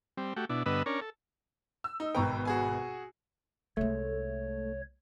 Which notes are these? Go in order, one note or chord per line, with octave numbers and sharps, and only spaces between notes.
G3 C4
A3 F#4 G4
B2 D4 E4
G2 D3 B3 B4 D#5 E6
C#4 D4 A#4 C#5
A4
E6
D#4
G#1 B2 B4 G5 A#5 C#6
F#4 G#4 G#5
C2 G#3 A3 C#5